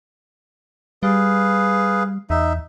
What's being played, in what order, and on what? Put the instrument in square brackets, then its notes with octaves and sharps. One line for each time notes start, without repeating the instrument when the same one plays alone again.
[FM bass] G3 [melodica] G#4 B4 F5
[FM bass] E2 [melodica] D#4 E5